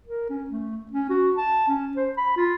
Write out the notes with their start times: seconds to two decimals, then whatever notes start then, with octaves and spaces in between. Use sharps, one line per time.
0.07 A#4
0.30 C#4
0.51 A3
0.92 C#4
1.10 F#4
1.37 A5
1.68 C#4
1.97 C5
2.17 B5
2.37 F4